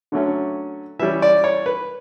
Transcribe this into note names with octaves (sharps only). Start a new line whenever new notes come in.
D3 F#3 A3 C#4
E3 G3 C#4 E5
D5
C#5
B4